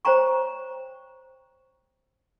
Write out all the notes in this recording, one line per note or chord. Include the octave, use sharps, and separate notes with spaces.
C5 C#5 G5 A#5 C#6